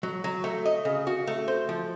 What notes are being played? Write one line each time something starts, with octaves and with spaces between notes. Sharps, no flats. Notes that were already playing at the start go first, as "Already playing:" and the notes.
F#3
F#3
A3
D#5
C#3
F#4
A3
C5
F3